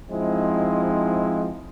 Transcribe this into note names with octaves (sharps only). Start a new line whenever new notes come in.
F3 G#3 C4 D#4 E4